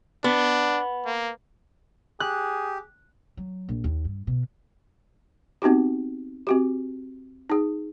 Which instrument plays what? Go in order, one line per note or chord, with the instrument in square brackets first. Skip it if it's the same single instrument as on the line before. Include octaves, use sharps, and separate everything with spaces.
[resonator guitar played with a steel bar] B3 [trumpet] D4
[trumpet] A#3
[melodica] G4 [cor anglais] G#4 [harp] F#6
[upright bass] F#3
A#1
D#2
G2
B2
[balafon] B3 C4 D#4 F#4 G4
C4 F#4 G4
D#4 G#4